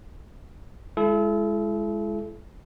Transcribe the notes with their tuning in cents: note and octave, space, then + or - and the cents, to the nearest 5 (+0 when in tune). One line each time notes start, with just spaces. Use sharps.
G#3 +0 E4 +35 A4 -40